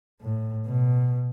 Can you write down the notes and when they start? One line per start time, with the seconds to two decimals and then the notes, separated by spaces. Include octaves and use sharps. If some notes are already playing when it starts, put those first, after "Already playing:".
0.21 A2
0.66 B2